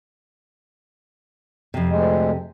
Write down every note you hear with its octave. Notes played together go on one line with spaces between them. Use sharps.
F2 C3
D2 G#3